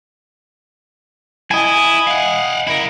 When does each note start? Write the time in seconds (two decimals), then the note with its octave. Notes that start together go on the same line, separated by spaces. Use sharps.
1.51 E4 D#5 G#5
2.07 F5 F#5
2.67 E4 A#4